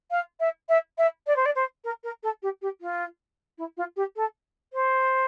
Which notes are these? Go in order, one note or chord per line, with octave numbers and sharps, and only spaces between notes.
F5
E5
E5
E5
D5
C5
D5
C5
A#4
A#4
A4
G4
G4
F4
E4
F4
G4
A4
C5